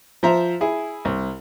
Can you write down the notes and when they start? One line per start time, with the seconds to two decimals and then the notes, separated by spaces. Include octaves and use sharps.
0.23 F3 C5 E5 A#5
0.61 E4 G#4
1.05 C2